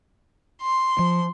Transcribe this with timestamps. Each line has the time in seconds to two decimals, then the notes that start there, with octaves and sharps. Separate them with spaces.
0.60 C6
0.99 F3